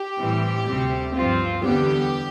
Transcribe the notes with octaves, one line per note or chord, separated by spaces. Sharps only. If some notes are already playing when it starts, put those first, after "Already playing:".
Already playing: G4
A2 E3 G3 C4
D2 C3 G3 C4
G2 F3 C4 F4
E2 D3 G3 B3 G4